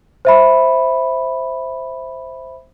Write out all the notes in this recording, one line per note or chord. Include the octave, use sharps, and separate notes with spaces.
C5 E5 B5